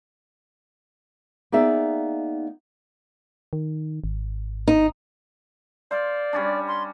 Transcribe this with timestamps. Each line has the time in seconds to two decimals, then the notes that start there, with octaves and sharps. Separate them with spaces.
1.52 A#3 B3 D#4 G#4 D5 E5
3.53 D#3
4.04 G#1
4.68 D#4
5.91 C5 D5 F5
6.33 G3 C#4 D4
6.68 C6